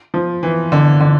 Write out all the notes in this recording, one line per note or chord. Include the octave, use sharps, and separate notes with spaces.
F3
E3
D3
D3